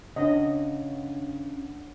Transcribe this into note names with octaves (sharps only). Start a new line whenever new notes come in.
C#3 D4 C#5 D#5 F#5